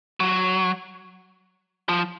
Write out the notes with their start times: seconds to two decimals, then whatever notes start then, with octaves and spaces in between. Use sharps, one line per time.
0.20 F#3
1.89 F3